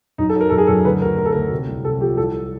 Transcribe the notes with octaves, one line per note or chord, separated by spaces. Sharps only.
F#2 D#4
A4
F#3
A#4
F#2 A4
G#4
F#2 A4
D2 B4
D2 A#4
D2 A#4
A4
D2 A#4
C3
C2
C3 A4
F3 G4
C2 A4